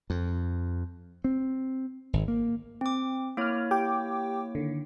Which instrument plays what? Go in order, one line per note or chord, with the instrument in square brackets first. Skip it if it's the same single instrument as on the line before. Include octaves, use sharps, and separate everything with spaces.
[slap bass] F2
C4
G#1
A#3
[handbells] C4 D6
[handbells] A#3 E4 C#5 [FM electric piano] D6 F6
[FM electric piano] G4 G5 D6
D3 D#3